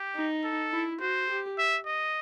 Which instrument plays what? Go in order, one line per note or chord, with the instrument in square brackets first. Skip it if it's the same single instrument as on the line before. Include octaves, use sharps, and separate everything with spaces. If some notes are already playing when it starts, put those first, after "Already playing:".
Already playing: [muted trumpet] G4
[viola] D#4
[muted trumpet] A4
[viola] E4
[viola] F#4 [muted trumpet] C5
[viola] G4
[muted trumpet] E5
D#5